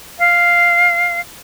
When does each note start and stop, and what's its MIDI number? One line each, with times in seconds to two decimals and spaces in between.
0.19 1.20 77